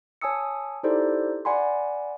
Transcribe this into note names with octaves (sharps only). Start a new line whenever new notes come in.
C#5 G#5 A5 D#6 E6 C#7
D#4 E4 G4 A4 C5 D5
D5 F#5 G#5 B5 C6